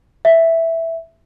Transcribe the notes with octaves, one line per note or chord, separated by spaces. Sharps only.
E5